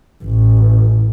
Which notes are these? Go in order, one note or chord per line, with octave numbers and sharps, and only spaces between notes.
A1